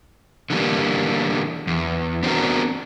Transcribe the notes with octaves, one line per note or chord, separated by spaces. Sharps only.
D3 E3 G3 A#3
E2
B3 C4 D4 F#4 A#4